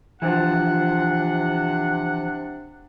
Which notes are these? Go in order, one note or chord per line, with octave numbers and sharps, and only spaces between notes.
C3 E3 F3 D4 F#5